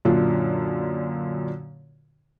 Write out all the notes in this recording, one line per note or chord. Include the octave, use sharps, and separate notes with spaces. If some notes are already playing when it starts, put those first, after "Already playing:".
F#2 A#2 D3 D4 F4